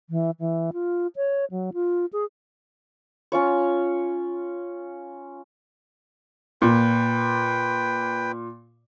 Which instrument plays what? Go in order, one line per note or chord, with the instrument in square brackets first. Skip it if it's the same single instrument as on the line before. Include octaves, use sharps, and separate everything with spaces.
[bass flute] E3
E3
F4
C#5
F#3
F4
G#4
[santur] C#4 F4 C#5
[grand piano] A#2 [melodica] B4 G5